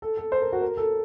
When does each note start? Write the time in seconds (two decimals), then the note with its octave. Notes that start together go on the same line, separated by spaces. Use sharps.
0.02 A4
0.17 A4
0.32 C5
0.42 A#4
0.53 F#4
0.62 A#4
0.77 A4